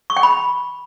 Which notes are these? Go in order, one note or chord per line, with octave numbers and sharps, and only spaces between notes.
C#6
G5
B5